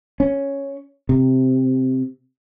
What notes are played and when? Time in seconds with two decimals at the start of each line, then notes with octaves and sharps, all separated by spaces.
0.20 C#4
1.09 C3